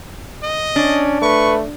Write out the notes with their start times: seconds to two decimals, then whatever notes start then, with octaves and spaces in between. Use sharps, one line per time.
0.43 D#5
0.76 C#4 D4
1.22 A3 B4 C#6